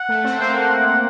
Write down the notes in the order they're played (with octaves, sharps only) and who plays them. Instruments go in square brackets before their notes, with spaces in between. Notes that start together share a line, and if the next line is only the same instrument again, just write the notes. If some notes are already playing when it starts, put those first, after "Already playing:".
Already playing: [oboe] F#5
[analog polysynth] A3
C4
[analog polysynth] A#3 [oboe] C5
[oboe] F#5
F#5
F#5